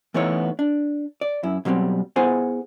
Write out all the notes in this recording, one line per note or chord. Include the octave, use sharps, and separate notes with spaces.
E3 A3 B3 D#4 E4 C#5
D4
D5
F#2 E4
B2 F#3 G3 A#3 C4
B3 E4 G#4 C5 F#5 G#5